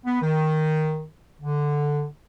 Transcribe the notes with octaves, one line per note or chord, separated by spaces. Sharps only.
B3
D#3
D3